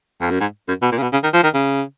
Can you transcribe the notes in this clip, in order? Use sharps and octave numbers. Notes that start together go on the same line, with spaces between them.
F2
F#2
G#2
F#2
B2
A#2
C#3
B2
C#3
D#3
F3
D#3
C#3